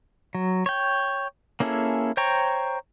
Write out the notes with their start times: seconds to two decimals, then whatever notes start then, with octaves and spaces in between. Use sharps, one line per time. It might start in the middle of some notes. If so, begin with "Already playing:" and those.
0.35 F#3
0.66 C#5 G5
1.60 A#3 C#4 E4 G#4 A4
2.17 C5 C#5 G5 A#5 C#6